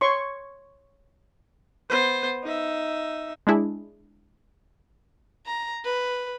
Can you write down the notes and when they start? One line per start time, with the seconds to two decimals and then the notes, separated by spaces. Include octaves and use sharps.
0.01 C#5 C6 C#6
1.90 B3 C5
2.43 D#4 E5
3.47 G#3 D4 E4 G#4
5.46 A#5
5.85 B4